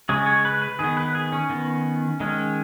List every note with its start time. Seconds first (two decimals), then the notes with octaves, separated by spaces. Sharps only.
0.09 C#3 G#3 C#4 G#4
0.26 C#5
0.45 B4
0.62 B4
0.79 D#3 B3 G#4
0.97 B4
1.15 G#4
1.32 C#4
1.50 D#3 B3
2.20 D#3 G#3 C#4